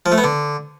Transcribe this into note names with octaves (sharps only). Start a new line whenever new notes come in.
F3
A3
B3
D3